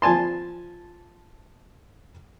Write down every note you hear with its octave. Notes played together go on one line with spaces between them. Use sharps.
F3 G#5 A5 C6